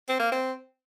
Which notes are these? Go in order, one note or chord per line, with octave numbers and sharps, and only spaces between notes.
C4
A#3
C4